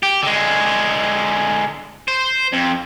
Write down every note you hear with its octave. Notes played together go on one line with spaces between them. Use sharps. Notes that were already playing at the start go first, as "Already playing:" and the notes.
G4
D3 G#3
C5
F2